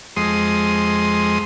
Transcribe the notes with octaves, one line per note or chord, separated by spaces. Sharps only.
F2 G#3 C6 D#6